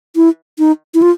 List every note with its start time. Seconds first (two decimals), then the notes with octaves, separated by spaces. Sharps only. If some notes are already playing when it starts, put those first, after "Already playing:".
0.16 E4
0.59 D#4
0.94 E4
1.02 F4